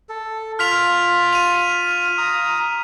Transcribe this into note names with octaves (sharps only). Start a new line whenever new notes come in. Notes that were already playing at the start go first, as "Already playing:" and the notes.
A4
F4 F6 B6 F7
D#7 F7
A#5 D#6